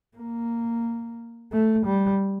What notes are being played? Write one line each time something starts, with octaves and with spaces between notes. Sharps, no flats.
A#3
A3
G3